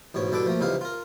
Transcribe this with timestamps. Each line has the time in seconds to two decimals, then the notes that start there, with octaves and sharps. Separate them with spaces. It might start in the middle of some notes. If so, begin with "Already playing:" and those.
0.14 A1 G#2 B2 C#5
0.31 C2 B2 D4 A4 B4 D6
0.45 F3 A3 A#3
0.60 C#2 C3 E3 D#4 F5
0.81 F4 A#4